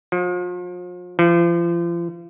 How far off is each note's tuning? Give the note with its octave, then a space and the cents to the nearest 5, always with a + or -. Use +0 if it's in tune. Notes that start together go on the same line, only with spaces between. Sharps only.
F3 +40
F3 -35